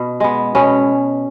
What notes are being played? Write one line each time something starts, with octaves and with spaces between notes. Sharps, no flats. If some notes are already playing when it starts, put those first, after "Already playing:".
Already playing: B2
G#3 B3
B2 C#4